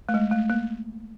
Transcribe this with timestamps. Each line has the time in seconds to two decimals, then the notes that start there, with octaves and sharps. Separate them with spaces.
0.09 A3
0.14 G#3
0.31 A3
0.50 A#3